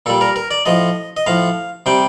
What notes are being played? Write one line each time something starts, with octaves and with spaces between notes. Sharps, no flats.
A#2 G3 A4
A#4
A#4
D5
A2 F3 D#5
D#5
A2 F3 F5
C3 G3 G5